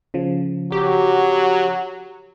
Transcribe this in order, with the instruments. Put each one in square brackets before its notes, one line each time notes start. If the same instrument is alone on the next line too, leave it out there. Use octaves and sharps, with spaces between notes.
[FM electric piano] C#3 F3
[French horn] F#3 [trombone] F#4 [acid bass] G4